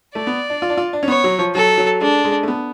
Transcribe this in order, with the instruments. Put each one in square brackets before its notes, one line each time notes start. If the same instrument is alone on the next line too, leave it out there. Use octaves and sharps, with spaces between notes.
[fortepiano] A3 [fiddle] D5
[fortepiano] B3
D4
F4
D4
F4
D4
C#4
[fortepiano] B3 [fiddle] C#5
[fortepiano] F#3
F3
[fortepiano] F#3 [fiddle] A4
[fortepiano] F#3
[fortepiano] G#3 [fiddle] D4
[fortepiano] G#3
A3
B3